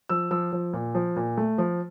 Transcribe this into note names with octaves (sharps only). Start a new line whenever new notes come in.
F3 E6
F3 E6
F3
A#2
F3
A#2
A3
F3